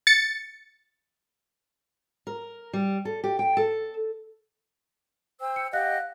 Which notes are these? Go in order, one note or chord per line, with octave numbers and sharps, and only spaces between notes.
A6 C#7
A#4
G3
A4
G4
G5
A4
C5 G5 E6
C#7
G4 D#5 F5 F#5 F#6